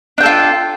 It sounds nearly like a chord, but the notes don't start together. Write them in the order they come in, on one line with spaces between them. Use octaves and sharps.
D4 G5 A4 F4